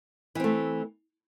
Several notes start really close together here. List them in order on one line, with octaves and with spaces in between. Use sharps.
E3 C4 A3